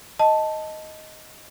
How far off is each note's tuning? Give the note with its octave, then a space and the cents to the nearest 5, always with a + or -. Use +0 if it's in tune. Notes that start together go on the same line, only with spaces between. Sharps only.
D#5 +5 A5 +0